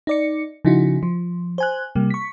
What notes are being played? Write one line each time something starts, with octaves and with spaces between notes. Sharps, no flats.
D#4 D5 C#7
C#3 F3 D#4 E4 F#4
F3
C5 G#5 F#6
C3 G3 A#3
C#6 B6